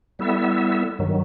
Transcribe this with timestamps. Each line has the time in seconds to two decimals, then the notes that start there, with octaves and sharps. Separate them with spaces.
0.19 G3 B3 E4 A4 E5
0.99 G2 D#3 F#3